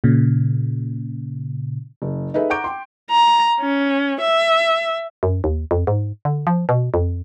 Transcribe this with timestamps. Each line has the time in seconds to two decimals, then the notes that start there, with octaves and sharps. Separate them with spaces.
0.04 A#2 C#3
2.02 F#1
2.34 D#4 G#4 A4 B4 E5
2.50 F#5 A#5 C#6 D6 G6 D7
2.64 G5 C6
3.11 A#5
3.61 C#4
4.21 E5
5.23 F#2
5.44 D#2
5.71 F2
5.87 G#2
6.25 D3
6.47 F3
6.69 B2
6.94 F2